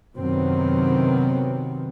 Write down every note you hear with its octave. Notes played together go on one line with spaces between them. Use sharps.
F#2 C3 D#3 F#3 B3 C4